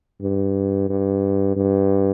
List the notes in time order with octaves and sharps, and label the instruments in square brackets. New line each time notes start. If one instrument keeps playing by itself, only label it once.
[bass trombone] G2
G2
G2